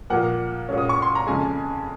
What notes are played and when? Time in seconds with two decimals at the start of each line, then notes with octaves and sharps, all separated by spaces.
0.10 A#2 F3 A#3 F#5
0.68 A#2 G#3 C#4
0.78 D#6
0.89 C#6
1.02 C6
1.15 A#5
1.27 F2 C#3 G#3 G#5